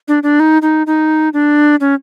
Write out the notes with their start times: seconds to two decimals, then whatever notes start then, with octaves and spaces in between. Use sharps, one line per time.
0.08 D4
0.23 D4
0.40 D#4
0.62 D#4
0.87 D#4
1.33 D4
1.80 C#4